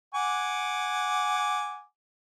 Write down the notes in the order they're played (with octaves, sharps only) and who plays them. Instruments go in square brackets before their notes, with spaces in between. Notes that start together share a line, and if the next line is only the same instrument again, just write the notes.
[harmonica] F#5 G#5 D6